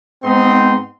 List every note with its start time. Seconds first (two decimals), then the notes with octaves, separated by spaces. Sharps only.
0.23 G#2 B3 C4 D#4 C6